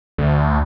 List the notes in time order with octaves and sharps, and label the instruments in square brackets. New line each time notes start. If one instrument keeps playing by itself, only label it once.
[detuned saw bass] D2